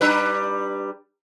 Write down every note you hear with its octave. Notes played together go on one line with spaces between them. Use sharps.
G3 D4 B4